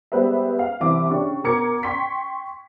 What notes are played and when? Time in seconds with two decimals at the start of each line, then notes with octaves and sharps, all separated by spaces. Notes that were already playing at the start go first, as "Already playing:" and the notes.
0.12 G3 G#3 B3 B4 C5 E5
0.59 F5
0.80 C2 E3 E5 D6
1.09 C#3 C#4 D4 G4 C#6
1.44 B2 A#4 A#5 D6 G#6 C#7
1.83 G5 C6 C#6 B6